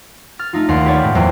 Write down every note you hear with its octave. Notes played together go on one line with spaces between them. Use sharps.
F6 A6
A3 D#4 F4
D#2 D5 F5 F#5 C6
F4 G4 B4 C#5 D5
A2 G#3 B3
E2 F#3 A#3 F4 C5 G5